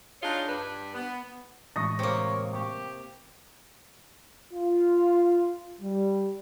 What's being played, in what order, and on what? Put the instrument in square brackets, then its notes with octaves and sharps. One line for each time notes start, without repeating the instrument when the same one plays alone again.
[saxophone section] D4 D#4 F4 G#4 C#5 D#5
G2 D4 B4
B3
[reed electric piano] A2 E3 G#3 [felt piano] C#6 D#6 A#6
[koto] C3 A#3 [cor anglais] C#5
[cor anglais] G4 [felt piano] C#6
[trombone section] F4
G3